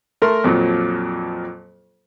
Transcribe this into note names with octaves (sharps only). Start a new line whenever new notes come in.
A3 A#4 C6
F2 A#2 F3 F#3